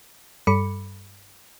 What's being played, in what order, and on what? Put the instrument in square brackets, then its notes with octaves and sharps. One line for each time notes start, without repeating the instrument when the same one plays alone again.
[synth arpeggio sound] G2 G3 A4 B5 D6 C#7